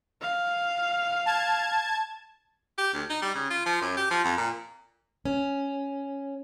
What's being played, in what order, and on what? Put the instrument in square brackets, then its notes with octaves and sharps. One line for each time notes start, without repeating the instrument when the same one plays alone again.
[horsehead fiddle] F5
[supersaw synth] A5 G#6
[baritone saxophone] G4
D2
D#4
G3
C#3
F4
F3
F#2
G4
F3
F2
A#2
[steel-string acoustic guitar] C#4